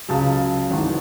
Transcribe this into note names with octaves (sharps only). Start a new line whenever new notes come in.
C#2 C#3 F#3 A5
G#1 G#2 E3